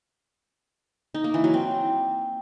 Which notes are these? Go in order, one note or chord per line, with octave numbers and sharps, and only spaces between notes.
D#4
A#3
E3
F#3
C4